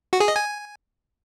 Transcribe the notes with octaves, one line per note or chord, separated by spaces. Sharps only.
F#4
G#4
D#5
G#5